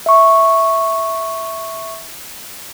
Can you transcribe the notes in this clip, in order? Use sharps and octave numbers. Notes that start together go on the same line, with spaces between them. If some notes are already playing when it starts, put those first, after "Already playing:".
E5 C#6